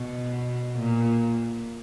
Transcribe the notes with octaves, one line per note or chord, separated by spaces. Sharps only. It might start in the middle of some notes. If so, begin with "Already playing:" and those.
Already playing: B2
A#2